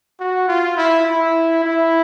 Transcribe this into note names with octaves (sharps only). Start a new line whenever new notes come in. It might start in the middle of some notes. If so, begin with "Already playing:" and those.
F#4
F4
E4
E4
E4